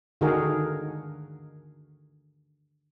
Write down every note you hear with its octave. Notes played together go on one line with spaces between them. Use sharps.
D3 D#3 D#4 F#4 G#4 A#4